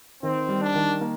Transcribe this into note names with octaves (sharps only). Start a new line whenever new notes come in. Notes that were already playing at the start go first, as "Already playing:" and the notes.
D#3 C4
G3
D4
D#3
A#3